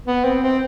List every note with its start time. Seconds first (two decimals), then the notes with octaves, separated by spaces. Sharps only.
0.07 B3
0.24 C4
0.43 C4